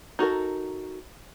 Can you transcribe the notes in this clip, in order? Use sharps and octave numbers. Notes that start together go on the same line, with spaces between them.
D#4 F#4 A4 A#4